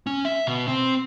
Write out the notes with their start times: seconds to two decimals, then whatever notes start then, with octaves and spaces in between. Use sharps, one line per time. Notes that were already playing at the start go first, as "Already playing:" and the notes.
0.07 C#4
0.25 E5
0.47 B2
0.67 C4